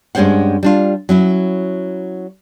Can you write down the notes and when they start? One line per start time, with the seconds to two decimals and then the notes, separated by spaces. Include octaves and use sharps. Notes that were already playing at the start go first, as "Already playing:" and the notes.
0.15 G2 G#3 C#4 G4 C5 F#5
0.63 G3 D4 F4
1.09 F#3 C#4 E4